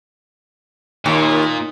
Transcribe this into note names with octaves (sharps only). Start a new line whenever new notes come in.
D#2 A#2